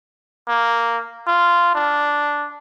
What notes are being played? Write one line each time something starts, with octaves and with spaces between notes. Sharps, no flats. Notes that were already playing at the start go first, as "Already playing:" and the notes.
A#3
F4
D4